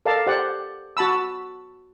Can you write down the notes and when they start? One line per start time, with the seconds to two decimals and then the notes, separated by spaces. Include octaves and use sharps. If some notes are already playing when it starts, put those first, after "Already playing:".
0.05 A4 A#4 D5 F5 A5
0.27 G4 C5 D5 F#5
0.97 F#4 A5 B5 E6